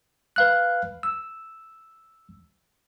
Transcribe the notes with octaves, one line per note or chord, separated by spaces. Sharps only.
B4 F5 F#6
E6